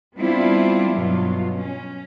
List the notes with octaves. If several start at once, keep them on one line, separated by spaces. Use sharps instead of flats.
G3 B3 C4 D4 E4 F4
G2 B2 F#3 F4
C#4